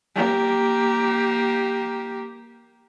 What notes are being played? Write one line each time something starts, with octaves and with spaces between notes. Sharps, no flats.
A#3 G4